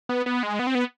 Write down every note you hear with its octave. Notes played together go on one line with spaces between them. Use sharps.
B3
B3
G#3
B3
C4
B3